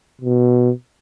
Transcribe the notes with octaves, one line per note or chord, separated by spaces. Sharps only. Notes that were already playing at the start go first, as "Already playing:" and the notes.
B2